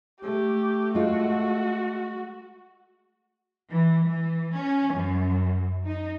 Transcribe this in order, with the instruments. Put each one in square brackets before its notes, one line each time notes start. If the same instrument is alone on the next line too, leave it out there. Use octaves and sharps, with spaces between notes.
[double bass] A3 [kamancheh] G4
[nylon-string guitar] G#3 F4 [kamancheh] F#4
[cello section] E3
E3
C#4
F#2
D#4